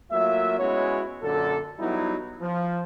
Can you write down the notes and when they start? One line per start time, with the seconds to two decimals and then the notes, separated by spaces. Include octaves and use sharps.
0.11 F#3 A3 A#3 F4 E5
0.58 G#3 B3 C#4 E4 F#4 C#5
1.23 F#2 A#2 D3 A4
1.79 F#3 G3 B3 D#4 E4
2.40 F3